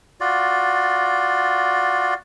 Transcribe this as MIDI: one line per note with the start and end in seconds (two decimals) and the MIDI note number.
0.20 2.14 65
0.20 2.14 66
0.20 2.14 74